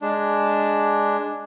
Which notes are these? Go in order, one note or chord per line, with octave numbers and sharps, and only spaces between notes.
G#3 D4